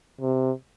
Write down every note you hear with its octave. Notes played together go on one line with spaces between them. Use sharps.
C3